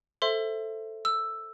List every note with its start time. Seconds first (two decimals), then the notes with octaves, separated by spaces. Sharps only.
0.22 A4 C5 E5 C6
1.05 E6